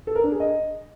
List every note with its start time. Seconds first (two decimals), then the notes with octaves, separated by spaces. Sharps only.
0.07 A4
0.15 A#4
0.24 D4
0.32 G#4
0.40 D#5